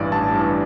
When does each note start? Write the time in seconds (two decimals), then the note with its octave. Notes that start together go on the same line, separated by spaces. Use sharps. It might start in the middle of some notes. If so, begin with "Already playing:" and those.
Already playing: A1 G2 E3 D5
0.12 A1 A5
0.34 G2
0.39 E3